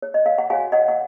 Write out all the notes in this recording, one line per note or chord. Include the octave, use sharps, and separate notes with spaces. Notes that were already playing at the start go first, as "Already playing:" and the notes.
C#5
D#5
F5
F#5
F#4 C#5 F5 G#5
D#5 F#5
F#5